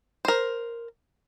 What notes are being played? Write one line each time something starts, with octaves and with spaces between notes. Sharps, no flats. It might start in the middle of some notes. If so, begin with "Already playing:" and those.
A#4 C5